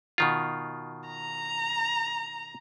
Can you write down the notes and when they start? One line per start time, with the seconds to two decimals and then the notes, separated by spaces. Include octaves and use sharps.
0.18 B2 D#3 F4
1.07 A#5